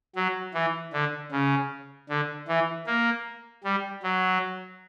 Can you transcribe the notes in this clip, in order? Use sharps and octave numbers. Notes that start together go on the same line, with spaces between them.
F#3
E3
D3
C#3
D3
E3
A#3
G3
F#3